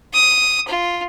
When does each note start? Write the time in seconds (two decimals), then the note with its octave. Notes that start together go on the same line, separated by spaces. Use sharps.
0.13 D#6
0.68 F4